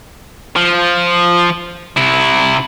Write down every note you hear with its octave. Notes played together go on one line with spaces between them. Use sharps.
F3
C3 E4